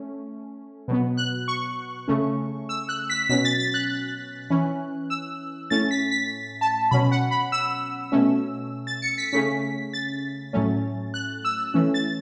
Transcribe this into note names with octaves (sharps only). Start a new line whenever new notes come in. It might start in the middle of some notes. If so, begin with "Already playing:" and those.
Already playing: A3 C#4
B2 F#3 B3
F#6
C#6
C#3 A3 C#4
E6
F#6
B6
B2 F#3 C#4 B6
A6
A6
F#6
E3 C#4
E6
A2 A3 C#4 A6
B6
B6
A5
B2 F#3 C#4 B5
F#5
B5
E6
B2 A3 C#4
A6
C#7
B6
C#3 A3 C#4 B6
A6
A2 F#3 A3 C#4
F#6
E6
E3 A3 C#4
A6